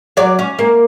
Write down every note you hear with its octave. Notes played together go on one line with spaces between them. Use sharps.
F#3 C#5 D5
C#4
A#3